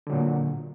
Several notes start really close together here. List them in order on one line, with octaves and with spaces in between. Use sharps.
D3 F#3 A#2